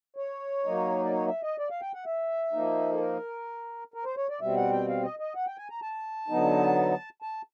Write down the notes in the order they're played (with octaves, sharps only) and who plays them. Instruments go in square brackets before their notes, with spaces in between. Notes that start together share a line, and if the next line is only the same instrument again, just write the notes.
[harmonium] C#5
F#3 A#3 D#4
D5
C#5
E5
D#5
D5
F5
G5
F#5
E5
F3 A#3 D#4
A4
A#4
A#4
C5
C#5
D5
B2 G3 C4 E5
F#5
G5
F5
D#5
D#5
F#5
G5
G#5
A#5
A5
D3 F#3 B3 D#4
A5